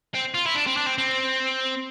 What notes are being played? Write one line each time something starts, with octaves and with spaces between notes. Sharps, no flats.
C4
F4
E4
D4
C4
D4
C4
C4